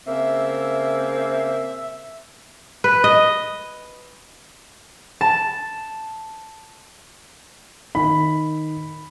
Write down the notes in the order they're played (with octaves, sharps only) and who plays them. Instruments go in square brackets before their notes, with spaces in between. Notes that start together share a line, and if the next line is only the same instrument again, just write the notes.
[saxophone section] C#3 A#3 C4 [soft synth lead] E5
[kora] B4
D#5
[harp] A5
[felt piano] D#3 [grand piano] B5